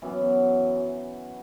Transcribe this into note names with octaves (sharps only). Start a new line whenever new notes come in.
F#2 E3 B3